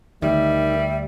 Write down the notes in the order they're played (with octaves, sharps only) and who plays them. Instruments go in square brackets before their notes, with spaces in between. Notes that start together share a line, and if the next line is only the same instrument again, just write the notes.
[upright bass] D2 [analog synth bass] D#3 [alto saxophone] G3 [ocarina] E5